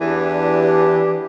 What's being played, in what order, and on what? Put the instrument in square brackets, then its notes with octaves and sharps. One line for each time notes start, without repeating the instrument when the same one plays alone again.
[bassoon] E2 [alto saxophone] E3 [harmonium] D4 G4